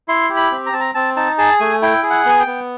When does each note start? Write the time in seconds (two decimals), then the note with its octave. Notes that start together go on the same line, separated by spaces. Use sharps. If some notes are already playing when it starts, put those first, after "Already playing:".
0.08 E4 C6
0.30 G4
0.36 B5
0.51 C4
0.66 A#5
0.73 C4 A5
0.80 A#5
0.95 C4 A5
1.16 D#4 A5
1.38 G#4 A5
1.60 A3 G#5
1.82 E4 G5
2.03 G#4
2.10 F#5
2.25 B3 G#5
2.40 G5
2.47 B3